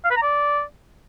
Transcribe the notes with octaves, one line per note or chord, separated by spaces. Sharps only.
F5
B4
A#5
D5